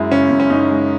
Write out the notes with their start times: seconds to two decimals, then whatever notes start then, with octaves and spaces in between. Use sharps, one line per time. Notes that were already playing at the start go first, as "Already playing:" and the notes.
Already playing: F#2 G#3 E4
0.11 C#3 C#4
0.31 F#2
0.40 C#4
0.50 F#2 D#4
0.69 G#3